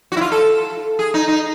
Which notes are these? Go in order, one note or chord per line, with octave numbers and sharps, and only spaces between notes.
F#4
E4
F4
A4
G#4
D#4
D#4